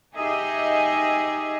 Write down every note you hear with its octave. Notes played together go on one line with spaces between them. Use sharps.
D#4 G4 G#4 D#5 E5